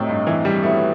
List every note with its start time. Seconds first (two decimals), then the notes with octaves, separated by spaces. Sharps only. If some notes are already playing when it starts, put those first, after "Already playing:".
Already playing: A2 C3 F#3 C4 D#4
0.09 G2
0.27 E3
0.45 G3
0.63 A2 F#3 A3 B3 E4